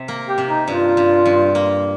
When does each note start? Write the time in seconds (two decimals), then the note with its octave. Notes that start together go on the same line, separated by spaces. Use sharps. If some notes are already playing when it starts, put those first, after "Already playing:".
Already playing: C3
0.08 A#3
0.28 G4
0.38 C3
0.48 D#4
0.67 G2 F4
0.97 G2
1.26 G2
1.55 A#3